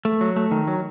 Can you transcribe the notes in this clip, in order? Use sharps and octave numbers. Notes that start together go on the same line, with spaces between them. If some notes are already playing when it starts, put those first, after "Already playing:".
A3
F#3
A3
D#3
F#3